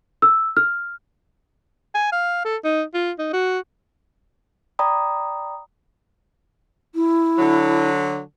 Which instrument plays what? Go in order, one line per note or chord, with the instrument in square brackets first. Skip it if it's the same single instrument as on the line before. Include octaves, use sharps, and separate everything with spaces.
[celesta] E6
F6
[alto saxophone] G#5
F5
A4
D#4
F4
D#4
F#4
[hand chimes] D5 G5 A#5 B5 D#6
[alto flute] E4
[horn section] D3 F#3